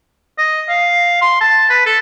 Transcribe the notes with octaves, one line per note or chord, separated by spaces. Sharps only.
D#5
F5
C6
A5
B4
A4